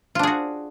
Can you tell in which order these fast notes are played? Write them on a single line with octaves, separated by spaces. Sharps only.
F4 D4 G#4 F#4